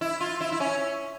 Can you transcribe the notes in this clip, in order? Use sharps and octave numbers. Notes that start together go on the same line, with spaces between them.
E4
F4
E4
E4
C#4